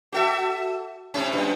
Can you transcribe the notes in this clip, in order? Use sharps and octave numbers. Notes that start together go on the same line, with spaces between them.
F#4 A4 E5
A2 C3 C#4
F#2 A#2